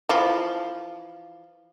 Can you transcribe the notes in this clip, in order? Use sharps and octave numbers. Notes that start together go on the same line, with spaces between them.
E3 F3